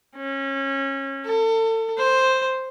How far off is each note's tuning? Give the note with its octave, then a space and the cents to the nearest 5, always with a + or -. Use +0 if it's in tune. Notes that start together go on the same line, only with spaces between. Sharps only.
C#4 -25
A4 +35
C5 +0